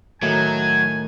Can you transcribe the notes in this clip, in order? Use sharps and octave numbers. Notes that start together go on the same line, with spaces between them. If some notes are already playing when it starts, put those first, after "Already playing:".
A2 D#3 F#3 G#5 G#6